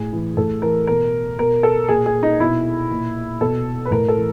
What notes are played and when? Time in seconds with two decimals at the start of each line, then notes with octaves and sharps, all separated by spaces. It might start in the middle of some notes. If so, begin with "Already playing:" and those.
Already playing: A2 G#4
0.13 E3
0.37 A2 A4
0.62 E3 A#4
0.87 B2 A#4
1.38 B2 A#4
1.63 A4
1.89 A#2 G#4
2.06 G#4
2.23 D#4
2.40 B2 E4
2.91 A#2
3.41 B2 A4
3.85 B4
3.91 A2 A#4
4.08 A4
4.17 E3